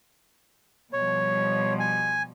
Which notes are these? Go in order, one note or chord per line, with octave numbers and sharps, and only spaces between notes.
B2 F3 G3 C#5
G#5